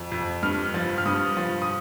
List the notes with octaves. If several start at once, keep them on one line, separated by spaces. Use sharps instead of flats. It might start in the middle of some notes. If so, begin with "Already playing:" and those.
Already playing: F2
F2
G2 F6
F3
F6
G2 D#6
F3
D#6